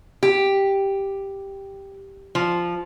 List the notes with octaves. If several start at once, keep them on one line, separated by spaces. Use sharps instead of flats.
G4
F3